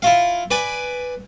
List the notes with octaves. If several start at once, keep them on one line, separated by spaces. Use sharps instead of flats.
E4 F4 F5
B4 D5 G#5